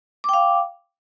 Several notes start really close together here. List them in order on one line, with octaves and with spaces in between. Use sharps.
D6 G5 F5